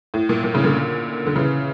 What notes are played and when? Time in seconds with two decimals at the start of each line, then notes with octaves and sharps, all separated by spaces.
0.14 A2
0.29 A#2
0.44 A#2
0.54 A2 C#3
0.64 A#2 D3
1.27 D3
1.36 C#3 E3